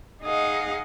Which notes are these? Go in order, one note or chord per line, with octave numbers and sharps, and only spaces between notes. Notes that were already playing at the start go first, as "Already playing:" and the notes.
D#4 G#4 D#5 F5 F#5